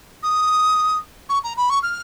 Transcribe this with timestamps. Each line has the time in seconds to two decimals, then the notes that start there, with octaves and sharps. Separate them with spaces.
0.23 D#6
1.29 C#6
1.44 A#5
1.57 B5
1.70 C#6
1.83 F6